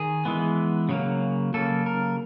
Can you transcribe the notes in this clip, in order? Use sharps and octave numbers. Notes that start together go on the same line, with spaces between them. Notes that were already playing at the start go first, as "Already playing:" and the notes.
Already playing: D#3 G#4
E3 G#3 B3
C#3 F#3 A#3
C#3 F#3 A#3 A4
A#4